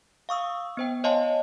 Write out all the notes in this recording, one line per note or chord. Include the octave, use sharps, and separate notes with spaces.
F5 C#6 D#6 E6
B3 C5 G5
C#5 D#5 F5 G#5 A5 C6